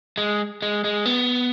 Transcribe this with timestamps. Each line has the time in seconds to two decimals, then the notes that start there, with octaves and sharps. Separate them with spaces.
0.18 G#3
0.62 G#3
0.84 G#3
1.05 B3